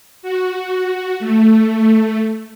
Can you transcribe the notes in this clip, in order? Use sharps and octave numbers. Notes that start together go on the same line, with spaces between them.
F#4
A3